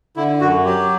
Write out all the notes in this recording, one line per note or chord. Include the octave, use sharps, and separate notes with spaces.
D3 E4
F#2 F#4
F#3 G4